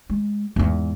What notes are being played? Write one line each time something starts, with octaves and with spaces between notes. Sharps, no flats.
G#3
E2 G#2